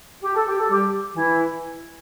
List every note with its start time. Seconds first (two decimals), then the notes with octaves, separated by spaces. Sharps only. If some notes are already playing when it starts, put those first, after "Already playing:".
0.23 G4
0.35 A4
0.47 G4
0.59 A4
0.70 G3 G4
1.16 E3 E4